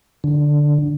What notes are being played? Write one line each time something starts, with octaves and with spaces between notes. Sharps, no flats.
D3